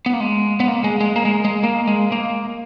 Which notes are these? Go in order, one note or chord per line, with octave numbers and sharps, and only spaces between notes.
B3
A#3
G#3
B3
A#3
G#3
G#3
A#3
G#3
G#3
A#3
G#3
A#3